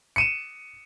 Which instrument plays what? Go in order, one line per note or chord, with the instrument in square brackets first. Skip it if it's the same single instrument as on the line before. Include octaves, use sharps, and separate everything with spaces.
[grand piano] C#7 D#7 E7